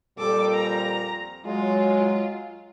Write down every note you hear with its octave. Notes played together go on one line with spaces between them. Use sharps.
F2 A#2 G3 A4 D6
A#5
F#3 G#3 F4